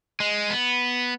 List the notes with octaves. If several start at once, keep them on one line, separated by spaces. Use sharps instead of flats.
G#3
B3